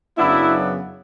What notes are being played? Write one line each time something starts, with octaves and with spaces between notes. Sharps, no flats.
F#2 C#3 F#3 B3 D4 E4